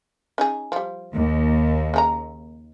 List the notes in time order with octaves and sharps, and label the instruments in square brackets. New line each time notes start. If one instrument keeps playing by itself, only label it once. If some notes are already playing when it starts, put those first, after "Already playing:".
[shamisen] C#4 D#4 G#4
F3 G3
[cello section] D#2
[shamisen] C#3 C#4 A#5